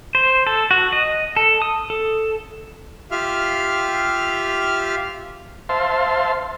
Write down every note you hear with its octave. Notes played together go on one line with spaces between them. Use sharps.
C5
A4
F#4
D#5
A4
D#6
A4
F4 G4 E5 F5 F6
C5 E5 F5 A5 C6